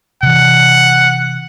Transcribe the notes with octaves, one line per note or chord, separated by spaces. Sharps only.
C3 E3 F#5